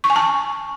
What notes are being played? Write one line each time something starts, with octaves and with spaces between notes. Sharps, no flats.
C#6
G#5
A5